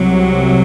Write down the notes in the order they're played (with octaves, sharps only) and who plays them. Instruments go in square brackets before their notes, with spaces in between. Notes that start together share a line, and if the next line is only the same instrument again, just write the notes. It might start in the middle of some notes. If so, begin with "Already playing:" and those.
Already playing: [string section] C2 C3 F#3